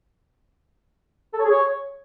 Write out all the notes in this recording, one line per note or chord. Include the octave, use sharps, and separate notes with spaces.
A4
C#5
G#4
C#5